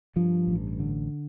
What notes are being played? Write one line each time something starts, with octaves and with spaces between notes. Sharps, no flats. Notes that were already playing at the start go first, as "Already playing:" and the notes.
G2 F3
A1
D3